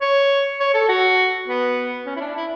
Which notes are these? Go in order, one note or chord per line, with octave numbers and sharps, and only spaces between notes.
C#5
C#5
A4
F#4
B3
C#4
E4
D4
E4